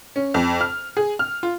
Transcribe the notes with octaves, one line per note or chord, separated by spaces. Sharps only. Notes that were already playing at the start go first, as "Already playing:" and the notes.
C#4
F2
F6
G#4
F6
F4